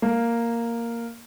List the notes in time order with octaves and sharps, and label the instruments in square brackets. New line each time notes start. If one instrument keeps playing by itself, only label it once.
[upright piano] A#3